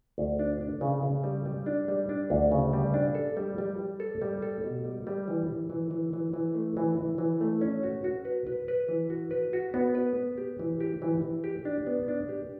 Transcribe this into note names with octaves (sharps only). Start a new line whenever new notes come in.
D2
D4
D4
C#3
C#3
G3
G3
D4
G3
D4
D2
C#3
G3
D4
A4
G3
G3
G3
A4
G3
A4
B2
G3
G3
E3
E3
E3
E3
E3
E3
A3
E3
E3
E3
A3
C#4
F#4
F#4
B4
B4
B4
E3
F#4
B4
F#4
B3
B4
B3
G4
E3
G4
E3
E3
G4
D4
B3
D4
G4